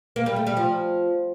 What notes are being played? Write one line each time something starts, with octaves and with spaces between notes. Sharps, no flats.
A#3
G3
A3
G3
F3